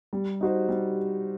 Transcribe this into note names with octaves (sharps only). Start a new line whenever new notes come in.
G3
D#4 F#4 C5
G3